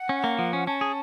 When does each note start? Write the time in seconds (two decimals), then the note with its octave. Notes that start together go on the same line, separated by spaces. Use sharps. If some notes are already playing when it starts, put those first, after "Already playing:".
Already playing: F#5
0.09 C#4
0.24 A#3
0.39 F3
0.53 C#4
0.67 C#4 A5
0.81 G#4